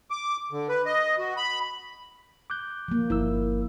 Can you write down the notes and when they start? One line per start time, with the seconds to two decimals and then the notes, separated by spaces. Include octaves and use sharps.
0.11 D6
0.51 D3
0.69 B4
0.86 D#5
1.18 F#4
1.37 B5
2.50 D6 F#6 G6
2.88 F3 A#3
3.10 G1 E4 A#4 E6